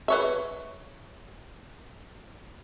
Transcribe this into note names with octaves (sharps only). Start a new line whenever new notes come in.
B4 C#5 E5